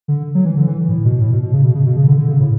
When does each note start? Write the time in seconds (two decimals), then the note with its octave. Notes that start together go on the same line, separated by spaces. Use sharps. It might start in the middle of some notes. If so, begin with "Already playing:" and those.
0.08 D3
0.35 F#3
0.45 E3
0.57 D3
0.67 E3
0.88 A2
1.05 B2
1.21 A2
1.32 B2
1.42 B2
1.53 C#3
1.64 B2
1.75 C#3
1.86 B2
1.96 C#3
2.07 D3
2.18 D3
2.29 C#3
2.39 A2